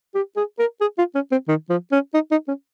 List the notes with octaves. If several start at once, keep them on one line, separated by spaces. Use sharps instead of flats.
G4
G#4
A#4
G#4
F4
C#4
C4
D#3
F3
C#4
D#4
D#4
C#4